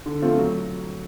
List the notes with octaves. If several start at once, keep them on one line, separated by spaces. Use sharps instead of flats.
D3
F3 A3 C4 F4
F#3